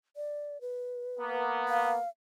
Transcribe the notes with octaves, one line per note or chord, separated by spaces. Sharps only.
D5
B4
A#3 B3
F5